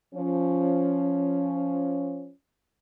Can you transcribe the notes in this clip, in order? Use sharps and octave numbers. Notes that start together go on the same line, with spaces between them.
F3 C#4